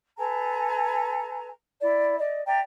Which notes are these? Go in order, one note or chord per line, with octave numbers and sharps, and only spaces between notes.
A4 B4 G#5 A#5
E4 D5
D5 D#5
D5 E5 G5 A#5